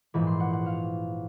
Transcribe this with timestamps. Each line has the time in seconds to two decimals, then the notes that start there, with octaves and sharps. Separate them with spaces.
0.14 A#1 G#2 E3 B5
0.27 C6
0.40 F#5
0.53 F#5
0.66 F5